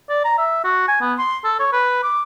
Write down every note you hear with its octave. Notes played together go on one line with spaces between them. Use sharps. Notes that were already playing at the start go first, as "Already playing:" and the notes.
D5
A#5
E5
F#4
G#5
B3
C6
A4
C#5
B4
D6